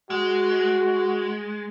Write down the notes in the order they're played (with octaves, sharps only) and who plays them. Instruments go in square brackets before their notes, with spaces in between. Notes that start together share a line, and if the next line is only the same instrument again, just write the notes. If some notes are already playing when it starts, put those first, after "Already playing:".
[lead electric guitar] G#3 [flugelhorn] F#4